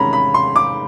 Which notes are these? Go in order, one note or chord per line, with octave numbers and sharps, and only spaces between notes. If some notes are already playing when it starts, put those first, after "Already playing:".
Already playing: E2 C3 D#3 G#3 C#4 A#5 B5
B5
C6
D6